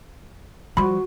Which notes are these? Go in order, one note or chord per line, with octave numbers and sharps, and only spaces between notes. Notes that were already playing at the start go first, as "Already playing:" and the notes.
F3 G3 F#4 B5 C6